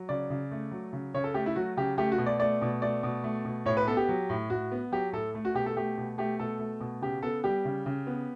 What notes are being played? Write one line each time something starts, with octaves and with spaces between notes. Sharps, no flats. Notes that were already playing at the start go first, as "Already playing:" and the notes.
Already playing: F#3
C#3 D5
C#3
A3
F#3
C#3
C#3 C#5
A4
A3 G4
E4
F#3 F#4
C#3 G4
A3 G4
F#4
B2
D5
A3 D5
B2
A3 D5
B2
A3
B2
A2 C#5
B4
B3 A4
G4
F#3
A2
A2 F#4
B3
F#3 G4
A2 A4
A3
F#4
B2 G4
A4
A3 G4
B2
A3 G4
B2 A4
A3
B2
C#3 G4
B3 A4
G3 G4
C#3
C#3
B3